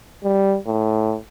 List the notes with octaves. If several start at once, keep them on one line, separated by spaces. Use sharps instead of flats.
G3
A2